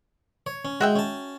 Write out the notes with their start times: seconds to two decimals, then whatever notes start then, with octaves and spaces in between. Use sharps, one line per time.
0.46 C#5
0.65 C#4
0.81 G#3 F#4 E5 G5
0.96 C#4 A5